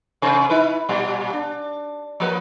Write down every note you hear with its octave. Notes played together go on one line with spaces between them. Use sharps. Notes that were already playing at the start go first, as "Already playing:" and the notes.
C3 C5
D#4 E4 B4
A#2 G3
D4
F3 A#3 B4